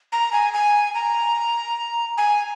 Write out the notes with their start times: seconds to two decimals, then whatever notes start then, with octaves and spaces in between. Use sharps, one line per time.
0.12 A#5
0.33 G#5
0.53 G#5
0.95 A#5
2.17 G#5